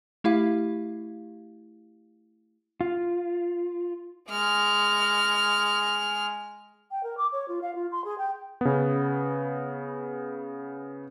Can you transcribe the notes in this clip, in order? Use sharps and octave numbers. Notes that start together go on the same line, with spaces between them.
A3 E4 G4 F5
F4
G#3 F6
G5
A#4
D6
C#5
F4
F5
F4
C6
G#4
G5
C#3 B3